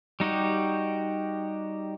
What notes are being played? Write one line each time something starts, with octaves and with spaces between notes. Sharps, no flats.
G3 D#4 F#4 G4